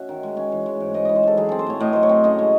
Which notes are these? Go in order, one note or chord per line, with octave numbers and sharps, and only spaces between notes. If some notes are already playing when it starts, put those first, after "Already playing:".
Already playing: C#4 F#4 E5
D#3
G#3
C#4
E3
G#3
G#2
G#2 D#5
E3 D#5
C5
G#3 A4
F#3 G#4
C4 A4
C5
A2 C#5
A2 D#5
F#3 C5
C#5
C4
C#3 D#5
G#3